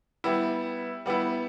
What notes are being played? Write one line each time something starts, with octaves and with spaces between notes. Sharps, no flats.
G3 B3 E4
G3 B3 E4